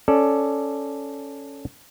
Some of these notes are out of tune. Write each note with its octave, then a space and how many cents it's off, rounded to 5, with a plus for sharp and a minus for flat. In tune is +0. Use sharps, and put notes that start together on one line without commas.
C#4 +0 A4 +0 D5 +5